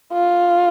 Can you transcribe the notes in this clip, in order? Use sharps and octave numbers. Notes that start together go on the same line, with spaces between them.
F4